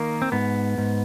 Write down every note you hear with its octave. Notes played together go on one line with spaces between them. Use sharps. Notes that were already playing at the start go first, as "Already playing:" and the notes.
Already playing: D#3 A#3
C4
G#2 B3
G#2